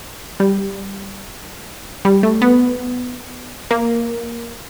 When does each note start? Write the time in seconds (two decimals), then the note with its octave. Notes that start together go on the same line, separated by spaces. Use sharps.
0.40 G3
2.05 G3
2.23 A3
2.42 B3
3.71 A#3